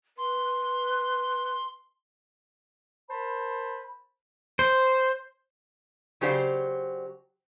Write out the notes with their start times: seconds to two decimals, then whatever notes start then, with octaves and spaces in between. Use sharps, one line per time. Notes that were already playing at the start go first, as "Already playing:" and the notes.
0.17 B4 C6
3.10 A#4 C5 A5 B5
4.59 C5
6.21 C#3 F#3 G4 C5 D5 F5